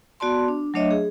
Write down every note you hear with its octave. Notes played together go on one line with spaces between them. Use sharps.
B3 F#4 D5 A5 C6
D4
F#3 A3 D4 C#5 D#5 E5
G#4